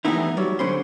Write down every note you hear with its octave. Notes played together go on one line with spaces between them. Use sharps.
E3 G3 A3 B3 D#4 E4
F#3 G3
D3 C#4 C5 B5 C6